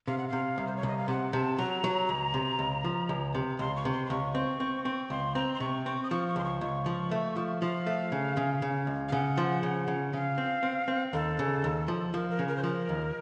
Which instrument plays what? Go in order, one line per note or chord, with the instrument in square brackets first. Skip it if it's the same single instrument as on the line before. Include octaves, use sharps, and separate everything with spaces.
[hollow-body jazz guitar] C3 [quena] F5
[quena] F#5
[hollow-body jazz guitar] C3 [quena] F5
[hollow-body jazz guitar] C2
[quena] C5
C#5
[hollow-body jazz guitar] C2 [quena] D#5
[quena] F5
[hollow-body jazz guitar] C3 [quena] F#5
[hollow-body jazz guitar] C3 [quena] A5
[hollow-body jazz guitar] F#3 [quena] A#5
[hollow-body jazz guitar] F#3
C#2
C3
C#2
F3
C#2
C3
[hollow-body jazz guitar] C#2 [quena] C6
[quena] C#6
[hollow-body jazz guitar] C3
[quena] C6
C6
[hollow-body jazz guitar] C#2 [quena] C#6
[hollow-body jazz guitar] C4
C4
C4
[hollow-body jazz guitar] C#2 [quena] C6
[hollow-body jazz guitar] C4 [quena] A#5
[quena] C6
[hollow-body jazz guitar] C3 [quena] C#6
[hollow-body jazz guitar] C4 [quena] C#6
[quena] D#6
[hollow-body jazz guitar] F3 [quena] C#6
[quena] C#6
[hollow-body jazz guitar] C#2 [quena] C6
[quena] C#6
[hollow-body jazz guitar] C#2 [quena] C#6
[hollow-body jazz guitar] F3
A3
F3
[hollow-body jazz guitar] F3 [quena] F5
[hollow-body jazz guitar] A3
C#3
C#3
C#3
C#2
[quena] F5
[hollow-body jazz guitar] C#3 [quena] F#5
[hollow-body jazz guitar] F3
C#3
C#3
[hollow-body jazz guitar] C#3 [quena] F5
[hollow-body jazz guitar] C4
C4
C4
[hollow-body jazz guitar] D#2 [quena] A4
[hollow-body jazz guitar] C#3
D#2
F3
[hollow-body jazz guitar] F3 [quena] A#4
[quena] A#4
[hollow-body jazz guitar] C#3
[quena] A#4
C5
[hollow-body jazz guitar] F3 [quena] A#4
[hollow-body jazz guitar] D#2